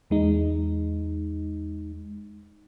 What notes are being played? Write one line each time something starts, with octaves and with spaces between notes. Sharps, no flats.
E2 G#3 D#4